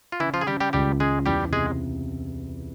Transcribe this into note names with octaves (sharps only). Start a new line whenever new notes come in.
F4
C#3 E3 E4
F3 F4
G#4
C#3 G3 G4
G3 G4
C#2 G3 G4
C#3 G#3 G#4
E2 G3 G4
C3 G#3 G#4